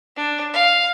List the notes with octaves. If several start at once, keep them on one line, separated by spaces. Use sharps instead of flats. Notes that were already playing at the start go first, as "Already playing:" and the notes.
D4
F5